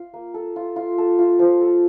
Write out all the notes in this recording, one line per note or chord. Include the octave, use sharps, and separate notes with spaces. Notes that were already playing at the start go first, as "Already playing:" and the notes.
Already playing: F4
A#3
A4
F4
F4
A4
F4
F3
A4